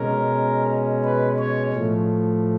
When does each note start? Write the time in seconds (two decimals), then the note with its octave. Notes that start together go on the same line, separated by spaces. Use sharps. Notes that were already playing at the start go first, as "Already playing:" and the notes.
Already playing: B2 G#3 C#4 A#4
1.04 B4
1.39 C#5
1.73 A2 F3 A3